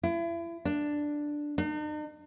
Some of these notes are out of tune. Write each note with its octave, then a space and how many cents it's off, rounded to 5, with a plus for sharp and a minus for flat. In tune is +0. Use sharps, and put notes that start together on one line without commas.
E4 +35
D4 +5
D#4 -45